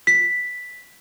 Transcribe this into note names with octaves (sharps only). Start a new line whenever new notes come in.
B6